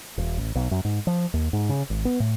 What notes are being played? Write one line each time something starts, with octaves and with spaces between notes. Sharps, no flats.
D#1
A1
B1
F#2
G#2
F3
D#2
G#2
C#3
G#1
B3
A2